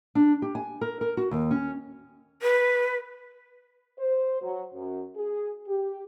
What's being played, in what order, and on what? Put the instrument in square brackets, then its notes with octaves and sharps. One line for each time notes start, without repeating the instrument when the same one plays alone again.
[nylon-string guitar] D4
G4
G#5
A#4
A#4
F#4
D#2
C#4
[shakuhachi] B4
[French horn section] C5
F#3
F#2
G#4
G4